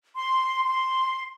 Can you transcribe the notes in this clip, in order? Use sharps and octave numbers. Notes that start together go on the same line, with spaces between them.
C6
C6